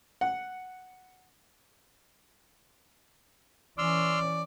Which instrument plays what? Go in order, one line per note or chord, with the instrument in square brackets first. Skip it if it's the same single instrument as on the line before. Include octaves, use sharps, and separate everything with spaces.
[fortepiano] F#5
[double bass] E3 C#4 [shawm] D5 [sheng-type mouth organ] C6 E6 F6